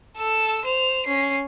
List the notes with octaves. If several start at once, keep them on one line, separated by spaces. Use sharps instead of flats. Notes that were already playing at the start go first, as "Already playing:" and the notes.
A4 E6
C5 F7
C#4 C7